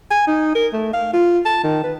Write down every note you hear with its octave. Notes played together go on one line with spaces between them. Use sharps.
G#5
D#4
A#4
A3
F5
F4
A5
D#3
B4